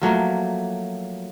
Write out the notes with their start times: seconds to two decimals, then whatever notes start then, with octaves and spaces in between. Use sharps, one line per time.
0.01 F3 F#3 A3 A#3